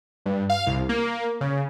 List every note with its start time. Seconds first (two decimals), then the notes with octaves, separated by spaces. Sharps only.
0.26 G2
0.49 F5
0.67 C2
0.89 A#3
1.41 C#3